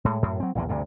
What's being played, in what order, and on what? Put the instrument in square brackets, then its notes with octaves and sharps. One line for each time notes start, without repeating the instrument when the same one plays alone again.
[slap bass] A2 G#3
F#2 A2
F#3 C4
A#1 E2 A2 D3
D2 G2 C3